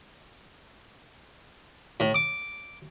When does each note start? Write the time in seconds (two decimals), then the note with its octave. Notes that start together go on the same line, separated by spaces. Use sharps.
2.00 A2
2.14 D6